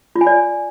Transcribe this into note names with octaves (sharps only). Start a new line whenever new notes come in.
F4
G#5
D5